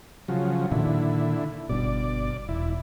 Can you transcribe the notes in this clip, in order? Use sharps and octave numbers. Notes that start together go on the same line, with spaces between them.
C#3 F3 F#3
A#2 D3 D#3 E4
G1 G2 B2 D5
E1 E4